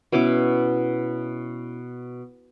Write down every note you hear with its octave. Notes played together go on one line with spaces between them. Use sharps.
B2 C#4 E4 D6